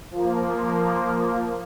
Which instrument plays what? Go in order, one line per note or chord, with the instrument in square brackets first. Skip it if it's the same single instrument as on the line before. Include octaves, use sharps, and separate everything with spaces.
[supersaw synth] F3 A#3